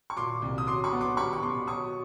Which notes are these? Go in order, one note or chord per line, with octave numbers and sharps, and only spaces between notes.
C#6
A#2 C6 D6
C2
D#6
F#3 C6 D6
B5 C#6
B3
C6 D6
G3 B5 C#6
C#6
B2 C6 D6
F#3 C#6 D#6